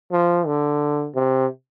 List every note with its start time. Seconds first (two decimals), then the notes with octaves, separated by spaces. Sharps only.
0.12 F3
0.46 D3
1.15 C3